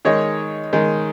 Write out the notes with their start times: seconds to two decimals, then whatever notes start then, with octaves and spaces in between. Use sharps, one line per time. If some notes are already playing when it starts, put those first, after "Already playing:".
0.05 D#3 G#3 D#4 C#5
0.73 D#3 G#3 D#4